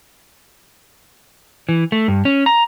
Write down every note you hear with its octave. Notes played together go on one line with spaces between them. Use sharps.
E3
A3
G2
C#4
A#5